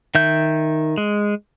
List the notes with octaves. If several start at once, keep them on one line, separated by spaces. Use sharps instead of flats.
D#3 E5 G6
G#3